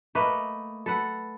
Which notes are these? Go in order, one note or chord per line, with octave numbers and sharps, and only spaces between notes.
A3 A#3 B4 D#5
A4 B4 F#5